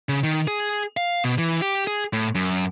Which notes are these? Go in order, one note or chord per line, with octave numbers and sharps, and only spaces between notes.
C#3
D#3
G#4
F5
B2
E3
G4
G#4
A2
F#2